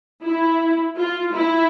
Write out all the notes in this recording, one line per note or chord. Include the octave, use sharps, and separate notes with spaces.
E4
F4
E4